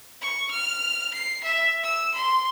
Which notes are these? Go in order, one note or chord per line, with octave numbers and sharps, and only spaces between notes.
C#6
F6
C7
E5
E6
C6